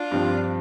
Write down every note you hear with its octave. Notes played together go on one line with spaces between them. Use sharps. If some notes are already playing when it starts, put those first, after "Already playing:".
Already playing: D4 F4
G2 F3 C4